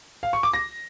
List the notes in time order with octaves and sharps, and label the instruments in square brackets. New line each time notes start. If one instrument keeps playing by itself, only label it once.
[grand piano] F5
C#6
D6
A#6